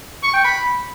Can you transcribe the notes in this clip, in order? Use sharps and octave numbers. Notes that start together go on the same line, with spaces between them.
C#6
G5
B5